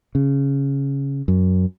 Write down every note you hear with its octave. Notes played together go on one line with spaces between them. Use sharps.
C#3
F#2